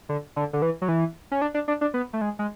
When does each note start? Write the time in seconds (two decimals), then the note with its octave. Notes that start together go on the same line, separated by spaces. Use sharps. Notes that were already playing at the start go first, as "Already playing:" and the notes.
0.09 D3
0.36 D3
0.53 D3
0.62 E3
0.82 F#3
0.88 E3
1.31 C#4
1.42 D4
1.54 D4
1.68 D4
1.81 D4
1.94 B3
2.13 A3
2.21 G#3
2.39 G#3